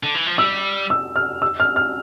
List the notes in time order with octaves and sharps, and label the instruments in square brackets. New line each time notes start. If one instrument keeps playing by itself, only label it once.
[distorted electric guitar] D3
E3
F3
[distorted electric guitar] G3 [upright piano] E6
[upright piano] E6
F6
E6
F6
F6